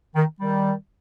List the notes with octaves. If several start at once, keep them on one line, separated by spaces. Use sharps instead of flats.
D#3
D#3 G3